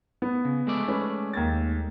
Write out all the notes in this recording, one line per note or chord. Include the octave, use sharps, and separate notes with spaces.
B3
C#3
G#3 A3 D5
C#4 B4
D#2 G#6 A6